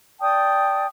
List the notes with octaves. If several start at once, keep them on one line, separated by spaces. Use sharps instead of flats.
D5 G5 A5 D#6